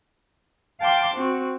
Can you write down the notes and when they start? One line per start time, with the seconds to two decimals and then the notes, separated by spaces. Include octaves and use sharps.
0.79 F5 G5 A5 C6 D6
1.14 C4 F#4